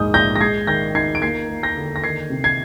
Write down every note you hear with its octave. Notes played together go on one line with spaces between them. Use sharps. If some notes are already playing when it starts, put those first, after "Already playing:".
Already playing: A#1 D#2 G#2 D#6 G6
A#1 G6 A#6
A#6
G#3 G#6 C7
D#3 G6 A#6
D#4 G#6 C7
D7
A#3 G#6 C7
A#3
G6 A#6
D3
A#6
D#3 G#6 C7
C3
G#6 C7